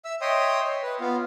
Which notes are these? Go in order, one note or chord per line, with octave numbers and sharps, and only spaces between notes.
E5 E6
C#5 D#5 E5 G5 C6 D#6
C#5
B4
B3 F4